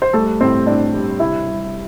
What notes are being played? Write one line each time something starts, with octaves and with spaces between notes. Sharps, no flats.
C5
G3 A3 A4
A2 C4 C5
A2 D4 D5
G3
C3 E4 E5
G3